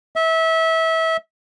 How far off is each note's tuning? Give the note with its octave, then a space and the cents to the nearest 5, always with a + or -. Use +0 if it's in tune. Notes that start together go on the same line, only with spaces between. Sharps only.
E5 -25